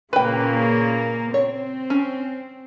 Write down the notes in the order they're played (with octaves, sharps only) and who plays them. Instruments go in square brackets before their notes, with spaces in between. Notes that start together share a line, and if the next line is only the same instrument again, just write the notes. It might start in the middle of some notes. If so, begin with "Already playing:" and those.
[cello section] A#2 C#3 A#3 [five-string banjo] B4 G5
[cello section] C4 [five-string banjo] C#5
[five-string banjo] C#4